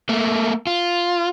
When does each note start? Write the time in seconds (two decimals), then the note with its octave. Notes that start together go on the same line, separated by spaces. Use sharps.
0.09 A3 A#3
0.67 F4